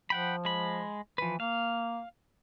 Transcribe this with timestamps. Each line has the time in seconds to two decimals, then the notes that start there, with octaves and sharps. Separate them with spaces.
0.10 F3 F#5 G5 B5
0.45 G#3 B5
1.18 E3 F3 B4
1.40 A#3 F5